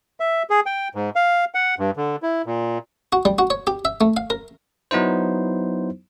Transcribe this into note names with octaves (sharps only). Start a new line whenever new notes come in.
E5
G#4
G5
G#2
F5
F#5
G2
D3
E4
A#2
F#4
G3
F#4
C#5
G4
E5
A3
F5
A#4
F#3 B3 D#4 E4 C5